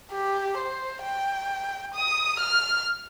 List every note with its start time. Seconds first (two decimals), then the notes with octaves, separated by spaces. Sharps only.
0.12 G4
0.58 C5
1.03 G5
1.95 D#6
2.40 F6